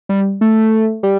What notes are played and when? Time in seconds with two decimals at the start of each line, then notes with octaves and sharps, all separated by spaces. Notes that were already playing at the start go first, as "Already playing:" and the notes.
0.09 G3
0.41 A3
1.03 G3